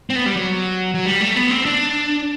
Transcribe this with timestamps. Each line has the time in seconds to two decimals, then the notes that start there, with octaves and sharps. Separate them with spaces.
0.10 C4
0.16 B3
0.26 G3
0.36 F#3
0.95 F#3
1.06 G3
1.21 A3
1.36 B3
1.50 C4
1.65 D4